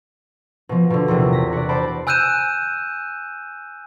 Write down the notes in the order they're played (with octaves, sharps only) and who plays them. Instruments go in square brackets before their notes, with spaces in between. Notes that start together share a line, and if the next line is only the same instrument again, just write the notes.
[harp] B2 F3
B2 D3
A#1 E2 C3
A#6 B6
F#4 D5
C5 D5 A5 B5
[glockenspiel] G#5 E6 F#6 G6 D#7 E7